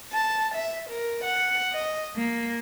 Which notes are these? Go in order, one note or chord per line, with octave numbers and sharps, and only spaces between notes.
A5
E5
A#4
F#5
D#5
A#3